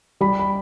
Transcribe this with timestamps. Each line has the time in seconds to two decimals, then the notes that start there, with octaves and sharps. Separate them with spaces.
0.21 G3 B5
0.39 B5